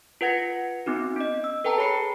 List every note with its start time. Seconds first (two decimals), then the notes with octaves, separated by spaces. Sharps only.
0.21 F4 B4 F#5 G#6 A#6 C#7
0.86 B3 C4 D#4 F#4
1.16 C#4 D#5
1.44 E6
1.65 A4 B4 G5 A5 A#5
1.78 G#4 C#5 B5 C7 C#7